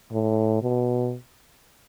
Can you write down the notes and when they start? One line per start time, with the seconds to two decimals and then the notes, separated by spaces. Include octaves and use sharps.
0.12 A2
0.62 B2